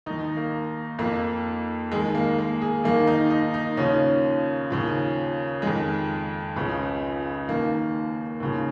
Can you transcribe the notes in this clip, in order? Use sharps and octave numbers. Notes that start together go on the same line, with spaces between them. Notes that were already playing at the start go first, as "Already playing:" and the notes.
D#2 D#3 D#4
A#3
F2 F3 A#3
D#2 D#3 G#3
A#3
A#3
G#4
D#2 D#3 A#3
D#4
D#4
D#4
D#2 C#3 F3 C#4
D#2 C#3 F3
F2 D#3 G#3
C#2 C#3 F3
D#2 D#3 A#3
D#2 C#3 F3